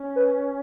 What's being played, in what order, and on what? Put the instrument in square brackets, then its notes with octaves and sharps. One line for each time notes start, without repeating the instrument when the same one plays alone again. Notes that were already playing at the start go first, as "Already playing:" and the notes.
Already playing: [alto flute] C#4
[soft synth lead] B4